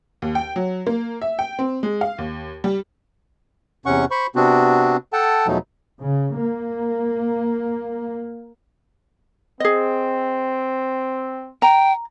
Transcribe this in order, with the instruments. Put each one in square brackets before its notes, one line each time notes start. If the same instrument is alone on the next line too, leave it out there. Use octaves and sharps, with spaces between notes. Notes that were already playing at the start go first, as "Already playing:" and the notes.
[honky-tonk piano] D#2
G5
F#3
A#3
E5
G5
C4
G#3
F5
D#2
G3
[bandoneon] E2 C3 C#4 F#5 C#6
C5 B5 C#6
C3 B3 C4 D4 F#4
A4 F#5 G5 A5
E2 B2 F3 F#3 A3 D#4
[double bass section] C#3
A#3
[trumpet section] C4 [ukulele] G#4 D#5
[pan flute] G5 [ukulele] A#5